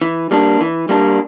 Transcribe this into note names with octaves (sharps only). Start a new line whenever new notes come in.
E3
G3 A#3 D4
E3
G3 A#3 D4